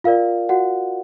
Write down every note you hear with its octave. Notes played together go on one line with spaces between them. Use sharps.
F4 A#4 D5 F5
F#4 F#5